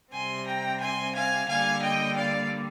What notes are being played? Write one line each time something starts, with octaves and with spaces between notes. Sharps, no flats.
C3 G3 C4 G#5 C6
G5 A#5
G#5 C6
F5 G#5
D3 G3 A#3 F5 G#5
D#5 G5
D5 F5